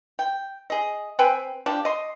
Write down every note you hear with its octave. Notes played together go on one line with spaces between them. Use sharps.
G5
G#4 D#5
C4 B4 G5 G#5
F3 D4 G4
D#5 C6